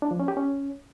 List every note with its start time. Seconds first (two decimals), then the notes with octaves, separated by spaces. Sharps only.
0.02 D4
0.11 F3
0.20 C#4
0.28 G4
0.37 C#4